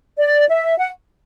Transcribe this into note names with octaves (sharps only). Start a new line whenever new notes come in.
D5
E5
F#5